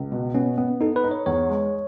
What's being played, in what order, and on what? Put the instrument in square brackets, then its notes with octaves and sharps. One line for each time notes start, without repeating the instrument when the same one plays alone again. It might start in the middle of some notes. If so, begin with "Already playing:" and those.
Already playing: [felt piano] C#2
B2
[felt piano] B3 [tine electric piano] C#4
[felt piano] B3
[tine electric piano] D#4 [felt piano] A4
[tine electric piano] B4
[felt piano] D#4
[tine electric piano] C#5
[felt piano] E2 [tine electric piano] C#5
[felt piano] G#3